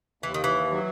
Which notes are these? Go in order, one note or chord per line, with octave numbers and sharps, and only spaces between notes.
D#2 E3
D#3
E3
F#3